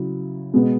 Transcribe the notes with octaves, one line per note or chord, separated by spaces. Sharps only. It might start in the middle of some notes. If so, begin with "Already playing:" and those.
Already playing: C#3 F#3 E4
B2 G#3 B3